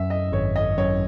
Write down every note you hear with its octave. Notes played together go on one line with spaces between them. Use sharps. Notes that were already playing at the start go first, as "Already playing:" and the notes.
Already playing: F#2 E5
D#5
G#1 C#5
D#5
F#2 C#5